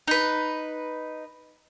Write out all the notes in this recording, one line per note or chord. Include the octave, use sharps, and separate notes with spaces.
D#4 B4